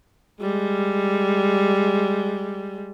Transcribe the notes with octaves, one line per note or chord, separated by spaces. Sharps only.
G3 G#3